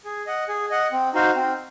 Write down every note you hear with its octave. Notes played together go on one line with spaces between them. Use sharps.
G#4
D#5 F#5
G#4
D#5 F#5
C4
D#4 F#4 C5 F5
C4